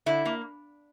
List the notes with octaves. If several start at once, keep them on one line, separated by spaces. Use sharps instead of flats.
D3 E4
A#3